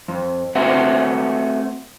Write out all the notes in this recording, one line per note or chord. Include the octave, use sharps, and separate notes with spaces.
F2
A3 C4 F#4 B4 E5 F#5